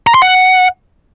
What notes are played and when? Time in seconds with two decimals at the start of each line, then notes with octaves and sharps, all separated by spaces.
0.07 A#5
0.14 C6
0.22 F#5